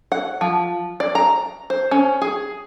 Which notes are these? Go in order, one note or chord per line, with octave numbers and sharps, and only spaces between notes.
F#5
F3
D5
A#5
C5
C#4
G#4